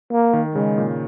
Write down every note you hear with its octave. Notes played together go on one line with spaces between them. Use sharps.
A#3
D#3
C#3 G#3
A#2